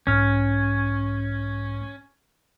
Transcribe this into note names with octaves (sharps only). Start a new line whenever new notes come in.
B1 G#2 C#4 F6